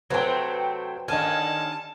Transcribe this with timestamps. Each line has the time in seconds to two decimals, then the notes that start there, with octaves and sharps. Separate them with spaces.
0.10 C3 F#3 A3 C4 B4 C5 G5
1.08 D#2 D3 D#3 D#5 G#5 A5 F6